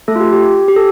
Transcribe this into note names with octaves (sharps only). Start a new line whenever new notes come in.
A3 A4
F4
G4
G4
G4
A4